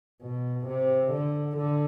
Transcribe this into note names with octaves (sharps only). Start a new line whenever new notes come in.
B2
C3
D3
D3